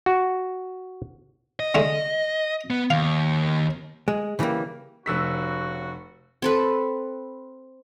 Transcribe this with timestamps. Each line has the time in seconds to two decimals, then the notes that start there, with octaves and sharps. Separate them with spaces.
0.06 F#4
1.60 D#5
1.75 D3 G#3 A3
2.70 B3
2.90 D#2 F5
4.08 G#3
4.39 C#3 E3 G3 G#3 A#3
5.06 F1 C#3 F#4 E6 B6
6.42 C4 A4 B4